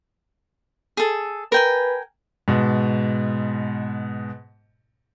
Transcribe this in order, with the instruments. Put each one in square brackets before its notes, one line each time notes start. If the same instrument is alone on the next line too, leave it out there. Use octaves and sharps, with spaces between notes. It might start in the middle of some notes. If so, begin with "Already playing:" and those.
[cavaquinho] G#4 A4
[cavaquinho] A#4 G5 G#5 [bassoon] B4
[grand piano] G#2 B2